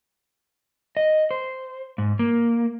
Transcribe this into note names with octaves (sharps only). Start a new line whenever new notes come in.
D#5
C5
G#2
A#3